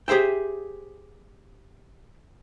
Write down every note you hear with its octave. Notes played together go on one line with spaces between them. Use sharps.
G4 G#4 C5 E5 G5